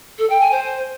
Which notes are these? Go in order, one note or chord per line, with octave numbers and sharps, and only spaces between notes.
A4
G5
G#5
C5